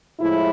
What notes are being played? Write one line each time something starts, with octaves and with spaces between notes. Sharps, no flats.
A2 F3 G#3 E4